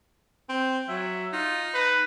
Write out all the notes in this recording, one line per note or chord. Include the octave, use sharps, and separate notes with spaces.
C4
F#3 E5
D#4 F4
B4